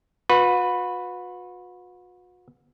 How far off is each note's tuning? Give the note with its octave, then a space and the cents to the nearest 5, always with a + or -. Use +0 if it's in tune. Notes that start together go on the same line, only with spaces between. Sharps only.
F#4 -40 B4 +0